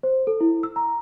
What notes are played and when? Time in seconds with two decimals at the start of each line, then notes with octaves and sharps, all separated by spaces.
0.03 C5
0.27 A4
0.41 E4
0.63 E6
0.76 A#5